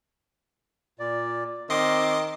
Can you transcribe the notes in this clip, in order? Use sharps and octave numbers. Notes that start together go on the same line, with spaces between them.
A#2 D5
D#3 C4 D#5 C6 D6